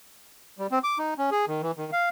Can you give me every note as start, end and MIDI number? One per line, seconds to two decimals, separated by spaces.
0.58 0.67 55
0.71 0.79 60
0.84 0.98 86
0.98 1.14 63
1.18 1.30 61
1.31 1.45 68
1.48 1.62 51
1.62 1.71 52
1.78 1.90 51
1.92 2.09 77